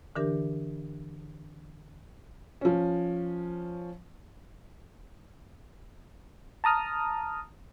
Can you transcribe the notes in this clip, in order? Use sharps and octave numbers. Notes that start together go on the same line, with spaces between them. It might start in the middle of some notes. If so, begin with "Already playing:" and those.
D3 E3 D4 G4 A#4
F3 C#4
A5 A#5 D#6 F6